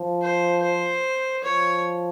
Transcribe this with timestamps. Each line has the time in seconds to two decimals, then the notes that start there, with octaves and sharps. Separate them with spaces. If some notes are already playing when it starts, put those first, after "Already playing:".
Already playing: F3
0.22 C5
0.62 C5
1.43 F3 C#5